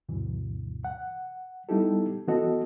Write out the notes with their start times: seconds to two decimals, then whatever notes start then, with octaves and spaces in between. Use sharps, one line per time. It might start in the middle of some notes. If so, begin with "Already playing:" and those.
0.09 D2 G2 B2 E3
0.85 F#5
1.69 G3 B3 D#4 E4 G4 A4
2.28 E3 B3 F#4 A4 D#5